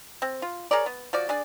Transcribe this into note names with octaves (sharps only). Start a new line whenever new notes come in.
C4
F4
G#4 A#4 C#5 D5
B3
F3 F#4 D5
D4 G#4 D5